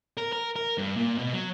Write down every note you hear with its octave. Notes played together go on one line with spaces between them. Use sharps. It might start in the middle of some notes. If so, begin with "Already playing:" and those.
A#4
A#4
A#4
G2
A#2
B2
F#3